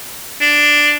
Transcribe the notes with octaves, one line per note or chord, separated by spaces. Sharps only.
D4